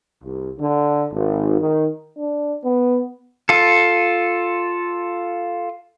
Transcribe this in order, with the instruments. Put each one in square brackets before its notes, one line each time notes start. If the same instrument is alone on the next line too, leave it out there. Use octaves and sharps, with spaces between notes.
[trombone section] C2
D3
G#1
D#3
[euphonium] D4
B3
[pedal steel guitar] F4 A4